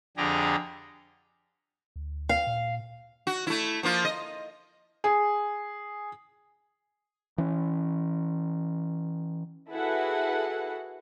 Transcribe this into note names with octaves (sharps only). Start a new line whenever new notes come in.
F2 D3 G4 G#4 A#5
D2
F5
A#2
F#4
A3 E4
F3 A#3 F4
D#5
G#4
E3 C#4
E4 F#4 G#4 A4 B4 F#5